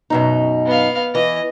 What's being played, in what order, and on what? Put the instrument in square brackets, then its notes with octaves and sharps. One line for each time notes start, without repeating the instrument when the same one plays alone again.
[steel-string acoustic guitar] F#2 B2 D#4
[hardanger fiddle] B3 F5
[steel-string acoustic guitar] E3 [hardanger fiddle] D#5